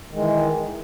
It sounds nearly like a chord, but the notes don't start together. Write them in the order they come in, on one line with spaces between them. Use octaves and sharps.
D#3 G#3 E3